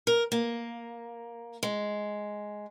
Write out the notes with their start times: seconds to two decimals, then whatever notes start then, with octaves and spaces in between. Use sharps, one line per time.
0.07 A#4
0.32 A#3
1.63 G#3